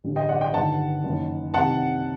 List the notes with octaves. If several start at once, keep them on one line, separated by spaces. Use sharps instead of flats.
A1 G2 D3
D#5 G5
D5 F#5
D#5 G5
G1 G2 D#3 F#5 A5
F#1 F#2 D#3
C2 C3 D#3 F#5 A5